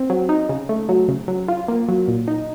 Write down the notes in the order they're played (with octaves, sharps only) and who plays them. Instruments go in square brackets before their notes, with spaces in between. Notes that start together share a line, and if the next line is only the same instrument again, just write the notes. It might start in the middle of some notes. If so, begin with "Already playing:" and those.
Already playing: [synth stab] C4
F#3
D#4
C#3
A3
F#3
C#3
F#3
F4
A#3
F#3
A#2
D#4